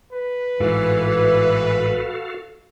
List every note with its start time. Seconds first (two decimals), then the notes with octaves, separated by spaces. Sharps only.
0.12 B4
0.60 A1 G#2 E3 F#4 A4 F5